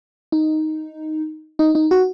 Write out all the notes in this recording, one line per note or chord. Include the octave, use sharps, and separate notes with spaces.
D#4
D#4
D#4
F#4